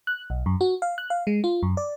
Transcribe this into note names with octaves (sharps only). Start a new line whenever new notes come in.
F#6
B1
F#2
F#4
F5
F#6
F5
G#3
F4
F#2
D5